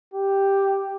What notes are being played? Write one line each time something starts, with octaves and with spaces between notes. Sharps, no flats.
G4